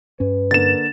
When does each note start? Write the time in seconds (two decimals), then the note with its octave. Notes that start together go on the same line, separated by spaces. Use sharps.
0.20 G2 C#4 B4
0.51 D3 A#3 A6 E7